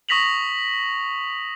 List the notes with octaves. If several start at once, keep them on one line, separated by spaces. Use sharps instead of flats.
C#6 D#6 A#6 B6 F7 F#7